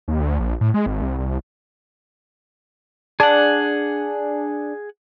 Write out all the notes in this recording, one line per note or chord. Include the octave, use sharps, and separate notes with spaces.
D#2
D2
A#1
A2
G#3
G#1
C2
C2
D4 G#4 F#5